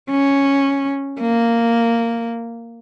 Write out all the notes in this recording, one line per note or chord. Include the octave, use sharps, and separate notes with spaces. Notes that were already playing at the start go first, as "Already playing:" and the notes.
C#4
A#3